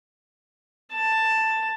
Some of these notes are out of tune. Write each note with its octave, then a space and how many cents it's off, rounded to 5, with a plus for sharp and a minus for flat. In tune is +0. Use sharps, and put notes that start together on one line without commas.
A5 +10